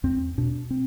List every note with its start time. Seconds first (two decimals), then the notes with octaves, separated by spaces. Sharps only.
0.03 E2 C4
0.38 B2 D4
0.70 C4